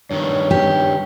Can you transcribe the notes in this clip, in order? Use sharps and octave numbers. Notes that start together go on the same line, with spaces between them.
G2 D#3 C#5
G4